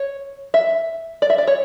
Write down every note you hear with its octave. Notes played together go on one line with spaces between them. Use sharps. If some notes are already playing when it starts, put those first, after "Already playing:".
Already playing: C#5
E5
D5
E5
D5
C#5